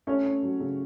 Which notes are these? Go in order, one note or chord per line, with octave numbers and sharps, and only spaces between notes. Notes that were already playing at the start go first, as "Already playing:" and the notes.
A3 C#4 C#5
C#4
F#3
C#3